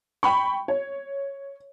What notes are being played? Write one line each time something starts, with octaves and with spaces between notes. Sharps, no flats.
G5 B5 C#6
C#5